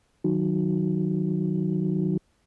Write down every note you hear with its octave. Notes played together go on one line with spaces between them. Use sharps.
D#3 F#3